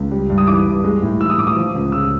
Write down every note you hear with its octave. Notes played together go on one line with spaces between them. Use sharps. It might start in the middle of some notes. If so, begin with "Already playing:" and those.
Already playing: C#2
G3
G2
D#6
E3 D6
G2
G#3
A2
E3 E6
D#6
A2 D6
D#6
F3
C#2
C#3 E6